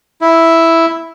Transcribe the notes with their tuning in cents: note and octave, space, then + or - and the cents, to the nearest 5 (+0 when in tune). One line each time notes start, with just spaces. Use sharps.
E4 +0 E5 +0